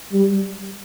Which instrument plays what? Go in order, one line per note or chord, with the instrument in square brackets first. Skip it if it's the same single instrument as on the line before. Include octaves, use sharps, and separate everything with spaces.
[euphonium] G3